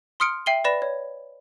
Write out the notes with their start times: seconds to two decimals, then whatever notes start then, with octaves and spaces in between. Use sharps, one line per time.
0.20 C6 D#6 F6 C#7 D7
0.46 E5 G5 C7 D#7 F#7 G7
0.64 B4 D5 B5 A#6 E7
0.82 C#5